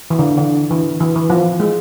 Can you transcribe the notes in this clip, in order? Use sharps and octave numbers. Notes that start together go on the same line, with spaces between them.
E3
D3
D3
E3
E3
E3
F3
G#3